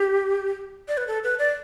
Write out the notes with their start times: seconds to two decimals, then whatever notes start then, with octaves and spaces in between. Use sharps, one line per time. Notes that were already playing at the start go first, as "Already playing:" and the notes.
Already playing: G4
0.88 D5
0.97 B4
1.07 A4
1.24 B4
1.39 D5